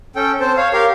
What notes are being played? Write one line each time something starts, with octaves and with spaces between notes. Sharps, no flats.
C#4 A4 G5
C4 C5 A5
C#5 F5
G4 A#4 F5